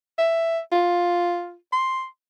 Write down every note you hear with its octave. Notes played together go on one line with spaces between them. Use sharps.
E5
F4
C6